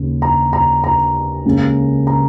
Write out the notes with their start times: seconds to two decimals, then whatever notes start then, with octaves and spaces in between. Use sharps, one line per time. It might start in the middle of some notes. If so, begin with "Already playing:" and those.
Already playing: D#2 C#3
0.22 A#5
0.53 A#5
0.84 A#5
1.45 C#2 C#3 A#3 C#4
2.07 A#5